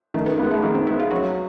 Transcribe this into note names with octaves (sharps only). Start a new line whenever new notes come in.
D#3 A3
B3
G#3 A#3 B3
A3
D#3 A#3
C4
G#3 B3 E4
F4
F#3 F#4